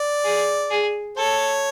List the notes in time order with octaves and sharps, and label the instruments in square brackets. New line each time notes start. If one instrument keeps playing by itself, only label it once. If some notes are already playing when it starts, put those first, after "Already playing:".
Already playing: [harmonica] D5
[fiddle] G#4
G#4
[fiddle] A4 [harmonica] C#5